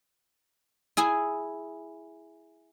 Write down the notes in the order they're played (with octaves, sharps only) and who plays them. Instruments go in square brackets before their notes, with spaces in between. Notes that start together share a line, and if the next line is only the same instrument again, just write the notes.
[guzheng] E4 G#4 G#5